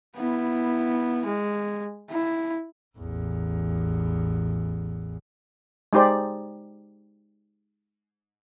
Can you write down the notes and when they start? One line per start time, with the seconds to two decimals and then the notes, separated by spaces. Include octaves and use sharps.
0.16 B3 E4
1.26 G#3
2.10 E4
2.98 A1 E2
5.93 G#3 D#4 G4 C5 D5